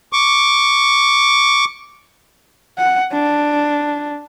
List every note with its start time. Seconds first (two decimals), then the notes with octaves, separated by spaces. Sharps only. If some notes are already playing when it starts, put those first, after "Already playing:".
0.13 C#6 D6
2.78 F#5
3.12 D4